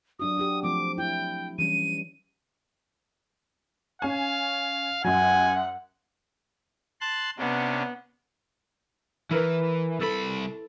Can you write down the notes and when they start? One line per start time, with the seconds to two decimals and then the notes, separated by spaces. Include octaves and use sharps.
0.19 F#3 D4 F#4 D#6
0.38 D4 F#4 G4
0.63 F3 A3 C4 D6
0.98 E4 G5
1.59 E3 G3 C#4 D#7
4.02 C#4 F5 G#5
5.04 F#2 F#3 F#5 G#5
7.01 A5 C6 F#6
7.38 C3 B3 C#4 D4
9.31 E3 E4 A#4 B4
10.01 C2 A4 B5